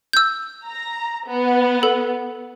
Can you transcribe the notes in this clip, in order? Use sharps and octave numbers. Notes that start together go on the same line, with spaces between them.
E6 G6
A#5
B3
A4